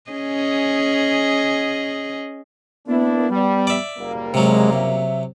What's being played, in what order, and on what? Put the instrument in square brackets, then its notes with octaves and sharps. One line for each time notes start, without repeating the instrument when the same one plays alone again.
[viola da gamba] C#4 G#4 D#5
[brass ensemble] A#3 D4 E4 [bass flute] B3
[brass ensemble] G3
[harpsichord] D5 E5
[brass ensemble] F#1 G3 A#3
[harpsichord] C3 F#3 [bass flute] G#3
[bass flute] E5